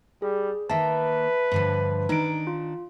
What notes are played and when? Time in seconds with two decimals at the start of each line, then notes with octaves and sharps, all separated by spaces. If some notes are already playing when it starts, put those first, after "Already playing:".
0.22 G3 G#4
0.69 D#3 A#3 B4 E5 A5
1.52 G2 D3 F3
2.09 D#3 D4 D#4 D7
2.47 F4